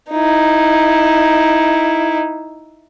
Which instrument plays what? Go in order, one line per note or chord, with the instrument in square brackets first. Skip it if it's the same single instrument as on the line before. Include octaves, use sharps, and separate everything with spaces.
[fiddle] D#4 E4